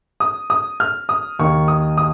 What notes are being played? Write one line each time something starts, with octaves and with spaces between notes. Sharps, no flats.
D#6
D#6
F6
D#6
D#2 D#3 A#3 C#6
D#6
D#6